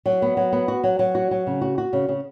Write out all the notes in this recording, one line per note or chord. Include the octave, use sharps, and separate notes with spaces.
F#3
B3
F#3
B3
F#4
F#3
F#3
F#4
F#3
C#3
F#4
F#4
C#3
C#3